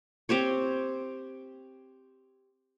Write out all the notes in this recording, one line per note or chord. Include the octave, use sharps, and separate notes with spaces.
C4 G4 C5 C#5